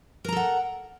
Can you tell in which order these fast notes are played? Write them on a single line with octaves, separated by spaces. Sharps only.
A#4 A#5 A4 F#5